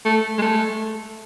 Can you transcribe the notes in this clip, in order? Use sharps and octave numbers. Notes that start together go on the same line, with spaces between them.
A3
G#3
A3